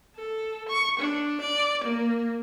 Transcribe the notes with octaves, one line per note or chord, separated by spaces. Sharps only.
A4
C#6
D4
D5
A#3